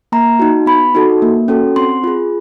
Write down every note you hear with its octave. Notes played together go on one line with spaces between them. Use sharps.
A#3 A#5
D#4 F#4
B3 B5
D#4 F#4 A4
A#3
C#4 F#4 A4
C4 C6
F4 G#4